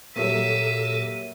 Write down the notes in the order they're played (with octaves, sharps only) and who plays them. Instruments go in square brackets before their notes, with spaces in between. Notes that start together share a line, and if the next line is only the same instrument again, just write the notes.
[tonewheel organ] A#2 A4 [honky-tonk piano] F#3 G3 A#3 [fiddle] E5 [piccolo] D#7